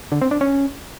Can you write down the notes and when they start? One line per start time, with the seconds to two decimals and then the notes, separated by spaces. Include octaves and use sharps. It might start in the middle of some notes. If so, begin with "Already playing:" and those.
0.12 D3
0.21 C4
0.31 D4
0.41 C#4